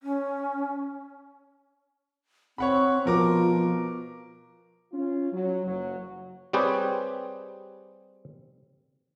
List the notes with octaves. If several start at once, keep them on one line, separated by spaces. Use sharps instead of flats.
C#4
C4 C#5 F#5 B5
B2 F3 A#4 D6
C#4 F4
F#3
F#1 F#3
G3 C4 G4 G#4 B4 C#5